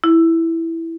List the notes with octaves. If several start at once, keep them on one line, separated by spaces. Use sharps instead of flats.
E4